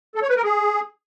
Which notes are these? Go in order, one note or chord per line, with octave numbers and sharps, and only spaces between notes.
A4
C#5
B4
A#4
G#4